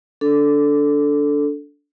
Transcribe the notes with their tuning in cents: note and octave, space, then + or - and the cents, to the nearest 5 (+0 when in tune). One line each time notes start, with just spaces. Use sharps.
D4 -15 A4 +0